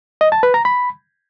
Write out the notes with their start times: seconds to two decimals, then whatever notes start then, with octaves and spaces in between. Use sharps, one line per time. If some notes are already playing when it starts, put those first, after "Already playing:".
0.21 D#5
0.32 A5
0.43 B4
0.54 A#5
0.65 B5